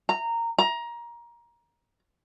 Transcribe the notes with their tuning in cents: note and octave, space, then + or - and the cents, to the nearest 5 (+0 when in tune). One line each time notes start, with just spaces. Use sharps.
A#5 -15
A#5 +20